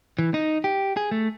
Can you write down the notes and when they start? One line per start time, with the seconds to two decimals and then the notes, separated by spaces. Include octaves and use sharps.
0.19 E3
0.34 D#4
0.64 G4
0.97 G#4
1.11 A3